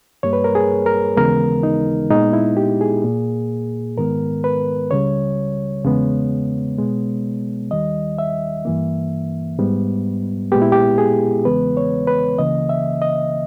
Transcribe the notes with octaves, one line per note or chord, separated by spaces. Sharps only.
G2 G3 A#3 C#5
B4
A#4
G#4
A#4
D#2 C#3 E3 G#3 B3 A#4
D#4
A#2 G#3 B3 D#4
E4
G4
G#4
A#2 A#3
G#2 D#3 G#3 B3 A#4
B4
C#2 C#3 G3 C#5
E2 C#3 G#3 B3
B2 G#3 B3
D#2 D#3 G3 D#5
E5
G2 E3 A#3
G#2 G3 B3
A#2 G#3 B3 G4
E4
G4
G#4
E2 C#3 E3 G#3 B3 B4
C#5
B4
C#2 C#3 E3 A#3 D#5
E5
D#5